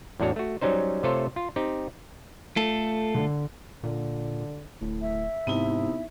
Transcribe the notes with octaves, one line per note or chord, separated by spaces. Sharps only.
E2 A2 D4 F#4 C#5
A3 F#4
F#3 G3 C#4 D#4 C5
C3 A3 F4 A4 C5 C#5
F4
C4 D#4 G4
A3 F4 A4
D3
A#2 D3
D1 A2
E5
G#2 C3 B3 D#4 E4